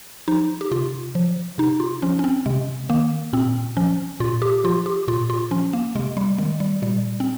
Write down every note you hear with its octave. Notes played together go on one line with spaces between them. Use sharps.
F3 D#4
G4
C3 F4
F3
C3 D#4
F4
F3 C#4
C#4
C4
C3 G#3
D#3 A#3
A#2 C4
F3 C#4
A#2 F4
G4
F3 F4
G4
A#2 F4
F4
F3 C#4
A#3
C3 G#3
G3
D#3 G#3
G3
A#2 G3
C4